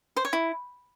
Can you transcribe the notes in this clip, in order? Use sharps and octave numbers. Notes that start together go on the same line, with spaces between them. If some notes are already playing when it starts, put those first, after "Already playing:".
C5
C#5
E4